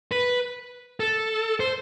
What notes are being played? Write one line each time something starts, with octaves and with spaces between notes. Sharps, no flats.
B4
A4
C5